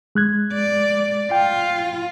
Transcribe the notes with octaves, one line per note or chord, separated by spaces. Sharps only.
G#3 F#6 G#6
D5
F4 G5